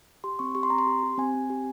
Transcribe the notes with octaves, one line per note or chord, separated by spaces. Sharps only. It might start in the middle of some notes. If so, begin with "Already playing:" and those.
G4 C6
C4 C#6
G4 C#6
C6
C4 A#5
C6
G4
G4
C4 G#5
C4
G4